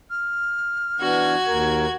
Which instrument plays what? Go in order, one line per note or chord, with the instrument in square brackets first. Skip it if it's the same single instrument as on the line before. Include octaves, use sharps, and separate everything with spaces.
[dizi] F6
[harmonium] E3 B3 D4 [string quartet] F#4 G#6
[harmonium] D#2 A#4